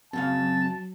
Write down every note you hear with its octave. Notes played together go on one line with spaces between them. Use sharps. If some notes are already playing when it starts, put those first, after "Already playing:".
F#2 C#3 F#3 C4 F5 A5 A6